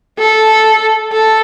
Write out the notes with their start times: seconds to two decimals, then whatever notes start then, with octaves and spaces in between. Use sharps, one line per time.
0.19 A4
1.13 A4